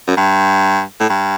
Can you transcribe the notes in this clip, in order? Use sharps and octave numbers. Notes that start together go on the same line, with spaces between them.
F#2
G2
A2
G2